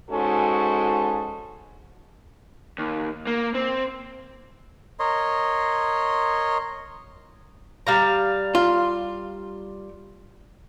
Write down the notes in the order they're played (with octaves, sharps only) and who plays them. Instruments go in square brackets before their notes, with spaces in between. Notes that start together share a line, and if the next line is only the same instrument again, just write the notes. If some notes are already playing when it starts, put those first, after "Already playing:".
[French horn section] G#2 G#3 C#4 F#4 A4
[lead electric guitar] D#2
A#3
C4
[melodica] A#4 C#5 D#5 C6
[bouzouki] G3 F5 A#5
[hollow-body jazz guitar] F4